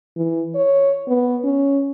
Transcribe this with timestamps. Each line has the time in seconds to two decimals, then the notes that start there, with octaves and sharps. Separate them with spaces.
0.17 E3
0.55 C#5
1.08 B3
1.44 C#4